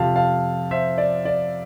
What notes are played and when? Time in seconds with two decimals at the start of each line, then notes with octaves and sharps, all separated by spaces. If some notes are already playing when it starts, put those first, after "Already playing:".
Already playing: F2 C3 F3 F5 A5
0.16 F5 A5
0.71 C5 E5
0.98 D5
1.25 D5